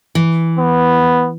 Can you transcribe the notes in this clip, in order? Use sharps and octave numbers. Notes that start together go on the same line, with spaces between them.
E3
B3